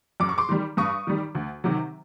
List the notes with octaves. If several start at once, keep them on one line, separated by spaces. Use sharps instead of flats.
F#2 D6
C#6
C6 D6
D#3 G3
G2 C#6 D#6
D#3 G3
D2
C3 D#3 F#3